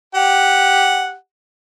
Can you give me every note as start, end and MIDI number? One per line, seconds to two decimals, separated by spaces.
0.15 1.14 67
0.15 1.14 78